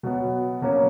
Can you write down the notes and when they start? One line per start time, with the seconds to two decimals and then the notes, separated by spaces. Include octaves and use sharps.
0.03 B2 F#3 B3
0.62 B2 F#3 A#3 C#4